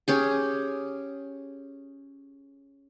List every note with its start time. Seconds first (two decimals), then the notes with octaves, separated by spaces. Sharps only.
0.08 C#4 G4 G#4